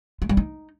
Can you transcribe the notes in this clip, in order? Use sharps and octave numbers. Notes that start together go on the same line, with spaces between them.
G#3
G3
D#4